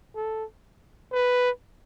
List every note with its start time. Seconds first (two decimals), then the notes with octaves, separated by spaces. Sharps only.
0.16 A4
1.12 B4